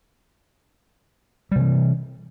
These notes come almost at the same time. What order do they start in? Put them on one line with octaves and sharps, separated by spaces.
G3 C3 E3